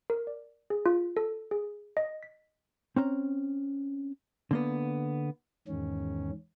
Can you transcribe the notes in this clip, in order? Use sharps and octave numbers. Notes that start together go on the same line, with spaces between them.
A#4
D5
G#4
F4
A4
G#4
D#5
B6
C4 C#4 A#5
D3 A#3 B3
E2 G#2 D#3 C#4